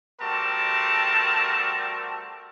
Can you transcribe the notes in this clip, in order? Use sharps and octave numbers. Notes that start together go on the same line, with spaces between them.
G3 A3 C4 F#4 A#4 A5